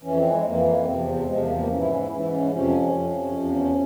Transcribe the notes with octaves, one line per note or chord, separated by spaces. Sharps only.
F2 E3 C#4
C4
G#3
F2 E3 A#3
A#3
A#3
E2 C3 F3 C4
E2 C3 F3 G#3
A#3
A#3
G#2 E3 C#4
E4
C#4
E4
G#2 E3 C#4
E4
C#4
F2 C3 F3 C#4
F2 C3 F3
E2 C3 F3